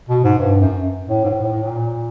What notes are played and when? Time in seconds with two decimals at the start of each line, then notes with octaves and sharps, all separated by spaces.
0.09 B2
0.24 G#2
0.38 G2
0.61 F#2
1.07 A2
1.24 G#2
1.30 A2
1.41 A2
1.52 A2
1.63 A#2